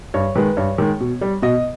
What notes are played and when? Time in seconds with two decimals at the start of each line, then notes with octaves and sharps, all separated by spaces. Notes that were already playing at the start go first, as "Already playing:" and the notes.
0.14 G2 C#5
0.35 D#3 G#3 B4
0.57 G2 C#5
0.78 D#3 G#3
1.00 B2
1.21 G3
1.42 B2 D#5